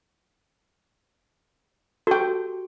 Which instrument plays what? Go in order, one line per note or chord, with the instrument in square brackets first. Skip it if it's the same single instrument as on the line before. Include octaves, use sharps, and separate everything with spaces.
[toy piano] F#4 G4 [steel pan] A4 G5